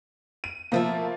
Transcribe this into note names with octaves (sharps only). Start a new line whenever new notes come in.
D#7
B2 F3 A3 A#3 E5